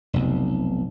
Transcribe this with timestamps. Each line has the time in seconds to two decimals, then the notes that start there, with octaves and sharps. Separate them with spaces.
0.13 F1 B1